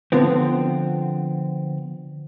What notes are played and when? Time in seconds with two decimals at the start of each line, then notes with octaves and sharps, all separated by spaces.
0.12 D3 F3 B3 C4